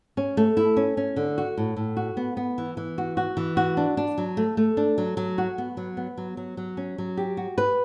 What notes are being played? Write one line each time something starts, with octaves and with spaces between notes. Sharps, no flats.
C#4
A3
E4
C#4
C#4
D3
F#4
A2
A2
F#4
B3
B3
E3
E3
F#4
F#4
E3
F#4
D4
D4
F#3
A3
A3
D4
F#3
F#3
F#4
B3
F#3
B3
F#3
F#3
F#3
C#4
F#3
G4
F#4
B4